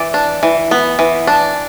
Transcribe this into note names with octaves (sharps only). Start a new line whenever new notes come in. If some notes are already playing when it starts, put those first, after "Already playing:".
Already playing: E3 D5
D4
E3
B3
E3
D4